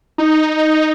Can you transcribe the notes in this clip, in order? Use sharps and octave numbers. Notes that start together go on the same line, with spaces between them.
D#4